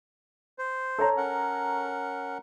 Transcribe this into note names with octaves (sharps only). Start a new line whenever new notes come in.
C5
A4 C#5 A#5
C#4 A#4 F#5